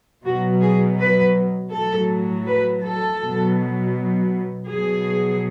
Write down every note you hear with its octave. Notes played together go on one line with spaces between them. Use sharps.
B2 F#3 F#4
G#4
B4
A2 F#3 A4
B4
A4
B2 F#3
B2 F#3 G#4